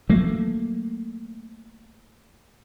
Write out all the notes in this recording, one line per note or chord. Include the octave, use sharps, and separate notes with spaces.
F#3 A3 A#3